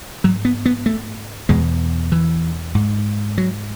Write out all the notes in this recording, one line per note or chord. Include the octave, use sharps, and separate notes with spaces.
G#2 F#3
B3
B3
A3
E2 B2 G#3
E3
G#2
F#3